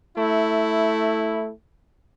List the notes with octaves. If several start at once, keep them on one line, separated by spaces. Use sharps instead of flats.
A3 E4